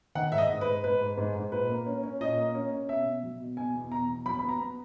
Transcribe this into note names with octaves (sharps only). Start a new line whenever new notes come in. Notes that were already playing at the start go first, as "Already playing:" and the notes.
D#3 F#5
G#2 E5
D#5
G#2
B4
G#2
G#2 B4
G#2
G#2
G#2
A#2 B4
A#3
C#4
C#4
A#2 D#5
A#3
C#4
C#4
B2 E5
B2
F#3
B2
B2 G#5
E2
B2 A#5
E2
F#3 B5
B3 B5
A#5
B3